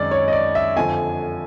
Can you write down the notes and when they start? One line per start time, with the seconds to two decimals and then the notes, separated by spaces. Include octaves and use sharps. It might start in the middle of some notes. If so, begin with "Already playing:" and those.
Already playing: F#2 D#3 G#3 C4 D#4 D5
0.11 C#5
0.28 D#5
0.33 D5
0.55 E5
0.77 F2 D3 F3 G#5